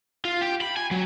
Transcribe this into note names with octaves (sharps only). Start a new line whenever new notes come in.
F4
G4
B5
G#5
F#3